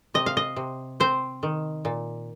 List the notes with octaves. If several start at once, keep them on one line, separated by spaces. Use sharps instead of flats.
C3 D#5
F5
D#5
C3
C4 C5
D#3
A#2